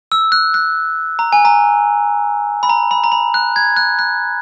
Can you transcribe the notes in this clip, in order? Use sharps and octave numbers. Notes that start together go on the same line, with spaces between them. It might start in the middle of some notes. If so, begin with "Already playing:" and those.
E6
F#6
F#6
A#5
G#5
A#5
B5
A#5
B5
A#5
B5
F#6
G#6
F#6
F#6